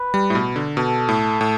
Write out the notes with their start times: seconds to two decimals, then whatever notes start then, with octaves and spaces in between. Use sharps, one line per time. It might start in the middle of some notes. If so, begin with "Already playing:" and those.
Already playing: B4
0.14 G3
0.30 A2
0.35 B2
0.56 D3
0.77 B2 A4
1.09 A2
1.41 A2